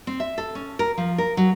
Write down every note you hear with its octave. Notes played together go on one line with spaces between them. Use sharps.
C4
E5
A4
C#4
A#4
F3
A#4
F#3